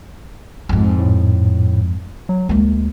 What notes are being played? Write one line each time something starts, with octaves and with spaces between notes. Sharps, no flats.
F2 G#2
A2
F#3
D2 G#3 A#3